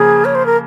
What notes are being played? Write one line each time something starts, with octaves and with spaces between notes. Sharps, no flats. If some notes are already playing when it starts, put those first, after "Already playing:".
Already playing: C#3 F3 A#3 G#4
C#5
C5
A#4